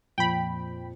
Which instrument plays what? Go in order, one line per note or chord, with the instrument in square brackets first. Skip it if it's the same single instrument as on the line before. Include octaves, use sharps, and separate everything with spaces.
[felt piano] F2 A#2 [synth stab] G5 B5